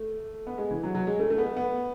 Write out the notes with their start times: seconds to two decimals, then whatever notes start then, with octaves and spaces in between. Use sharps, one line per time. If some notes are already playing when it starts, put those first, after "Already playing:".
Already playing: A3
0.47 B3
0.58 G#3
0.71 E3
0.83 F#3
0.95 F#3
1.07 G#3
1.19 A3
1.30 A3
1.38 B3
1.57 B3